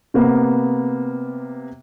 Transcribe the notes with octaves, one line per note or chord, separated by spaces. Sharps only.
C3 A#3 B3